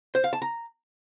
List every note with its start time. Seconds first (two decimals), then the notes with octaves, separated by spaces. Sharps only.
0.15 C5
0.24 F5
0.33 A5
0.42 A#5